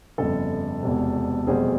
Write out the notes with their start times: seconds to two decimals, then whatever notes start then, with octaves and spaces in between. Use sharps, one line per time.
0.18 G1 F2 C#3 A4
0.83 E1 E2 C3
1.47 F1 E2 B2 G3 C4 G#4